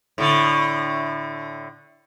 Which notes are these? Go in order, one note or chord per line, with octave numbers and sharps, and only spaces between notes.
A2 D3